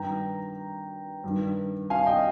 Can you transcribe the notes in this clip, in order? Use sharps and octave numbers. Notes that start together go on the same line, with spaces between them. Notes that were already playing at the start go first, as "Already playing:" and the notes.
Already playing: G2 D#3 G5 A#5
G2 D#3
F5 G#5
D#5 G5